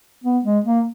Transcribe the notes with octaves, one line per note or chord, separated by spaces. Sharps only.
B3
G#3
A#3